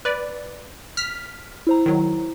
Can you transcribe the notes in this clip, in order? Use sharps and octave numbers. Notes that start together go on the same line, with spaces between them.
B4 D5
F6 B6
E4 C5 A#5
D#3 F#3